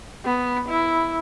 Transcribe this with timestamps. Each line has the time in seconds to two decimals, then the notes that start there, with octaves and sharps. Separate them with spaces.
0.25 B3
0.69 E4